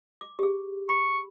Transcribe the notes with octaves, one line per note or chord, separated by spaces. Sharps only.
D6
G4 G#4
B5 C#6